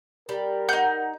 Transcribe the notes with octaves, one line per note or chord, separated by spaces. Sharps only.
G3 A#4
D#4 F#5 G6